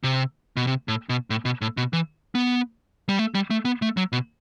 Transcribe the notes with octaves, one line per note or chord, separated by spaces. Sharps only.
C3
B2
C3
A2
B2
A2
B2
A2
B2
E3
B3
G3
A3
G3
A3
B3
A3
F#3
B2